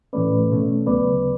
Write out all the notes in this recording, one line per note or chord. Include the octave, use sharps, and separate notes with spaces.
A2 E3 A3 C#4 B4 D5
B2 A3 C#4
D2 C#3 F#3 B3 B4 D5